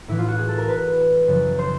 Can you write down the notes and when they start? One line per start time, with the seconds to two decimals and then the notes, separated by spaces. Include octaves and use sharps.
0.08 A2 E3 E4
0.19 F4
0.28 F#4
0.38 G#4
0.48 A4
0.58 A#4
0.68 B4
1.28 F#2 C#3 F3
1.59 C5